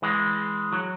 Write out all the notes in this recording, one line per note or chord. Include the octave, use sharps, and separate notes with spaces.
E3 G#3
F#3